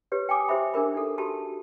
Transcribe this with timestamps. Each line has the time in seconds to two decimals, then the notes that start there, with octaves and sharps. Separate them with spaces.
0.12 G4 B4 C#5
0.29 G5 G#5 D6 D#6
0.49 G4 C5 E5 B5
0.74 D4 G#4 A#4 B5
0.94 D#4 A4
1.18 F#4 G4 A5 B5